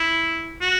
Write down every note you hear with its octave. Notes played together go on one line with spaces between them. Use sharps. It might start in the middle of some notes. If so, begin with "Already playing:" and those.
Already playing: E4
F#4